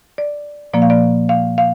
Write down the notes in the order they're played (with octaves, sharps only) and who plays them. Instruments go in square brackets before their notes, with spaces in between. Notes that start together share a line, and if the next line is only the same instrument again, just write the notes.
[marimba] D5
A#2 F3 A#3 D5
F5
D5
F5
F5